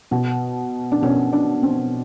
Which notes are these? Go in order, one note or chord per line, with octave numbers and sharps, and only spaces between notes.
B2
D4
B2 C#4
D4
C4